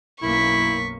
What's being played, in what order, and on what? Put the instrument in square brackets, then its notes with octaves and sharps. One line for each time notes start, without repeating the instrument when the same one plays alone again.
[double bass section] B1 F#2 A#3 [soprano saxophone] E4 [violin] C#6 B6